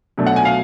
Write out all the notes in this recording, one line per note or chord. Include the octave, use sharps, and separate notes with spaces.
B2 F#3 A3 D4
F#5
G#5
F5